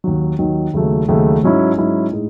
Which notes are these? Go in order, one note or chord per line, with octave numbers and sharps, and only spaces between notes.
D#2 D#3 F#3
D#2 D#3 F#3
D#2 C#3 F#3 A3
D#2 C#3 F#3 A3
G#2 F#3 C#4 E4
G#2 F#3 C#4 E4
A2 G#3 D#4